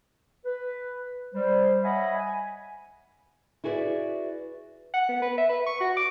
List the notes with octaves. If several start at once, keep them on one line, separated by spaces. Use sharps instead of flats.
B4
G3 C5
C#5 D#5 E5 F#5 G#5 B5
G#5
E4 F#4 G#4 B4 C5 D5
F#5
B3
B4
E5
B4
C#6
F#4
D6